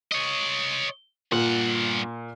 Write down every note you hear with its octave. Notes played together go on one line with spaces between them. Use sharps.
C#5 D#5
G2 A#2 F#5